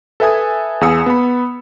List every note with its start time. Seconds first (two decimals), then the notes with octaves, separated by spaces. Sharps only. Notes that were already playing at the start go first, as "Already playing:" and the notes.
0.20 A4 B4 E5 G#5 D#6 G#6
0.81 E2 G#4 F5 D#6 E6 C#7
1.06 B3 B5